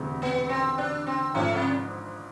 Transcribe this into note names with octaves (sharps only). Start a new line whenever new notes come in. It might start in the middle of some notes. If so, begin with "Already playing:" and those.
Already playing: E1 D2 C3
B3
C4
D4
C4
G#1 G#2 F3 A3
C3